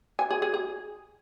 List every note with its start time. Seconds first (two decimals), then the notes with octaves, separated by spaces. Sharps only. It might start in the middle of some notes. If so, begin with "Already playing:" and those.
0.19 G#5
0.31 G#4
0.42 G#4
0.54 G#4